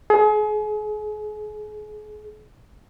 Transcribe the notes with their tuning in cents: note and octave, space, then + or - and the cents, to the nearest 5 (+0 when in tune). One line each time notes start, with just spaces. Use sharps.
G#4 +35